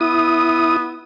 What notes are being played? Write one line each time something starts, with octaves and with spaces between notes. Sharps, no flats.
B3 E4 D#6